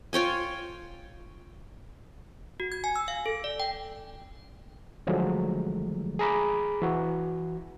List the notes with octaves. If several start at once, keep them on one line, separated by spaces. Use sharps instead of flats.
F4 C#5 G5 G#5
F#4
G#6
G#5
E6
F5
A4
D5
G5
D3 D#3 F3 F#3 G#3 A3
G#4 A#5 B5 D6
E3 F#4